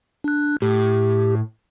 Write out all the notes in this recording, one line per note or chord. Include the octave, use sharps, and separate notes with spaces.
D4 F#6
A2 G4